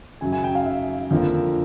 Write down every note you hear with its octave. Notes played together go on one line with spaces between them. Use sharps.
F#2 C#3 F#3 G#5
G#5
G5
F5
E5
F2 D3 F3 A#3